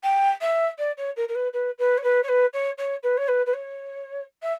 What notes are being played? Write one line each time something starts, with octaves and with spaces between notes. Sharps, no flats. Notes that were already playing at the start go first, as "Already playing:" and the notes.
G5
E5
D5
C#5
A#4
A#4
B4
B4
B4
C#5
B4
C#5
B4
C#5
C#5
B4
C#5
B4
B4
C#5
E5